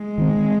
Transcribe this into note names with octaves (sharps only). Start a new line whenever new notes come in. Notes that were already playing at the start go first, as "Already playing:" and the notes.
Already playing: G#3
D#3 C4